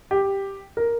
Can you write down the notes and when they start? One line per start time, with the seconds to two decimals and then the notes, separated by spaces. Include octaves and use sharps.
0.11 G4
0.77 A#4